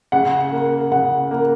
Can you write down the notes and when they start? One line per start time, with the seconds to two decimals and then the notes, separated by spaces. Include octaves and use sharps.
0.12 C#3 F#5
0.52 A#3
0.91 C#3 F#5
1.31 A#3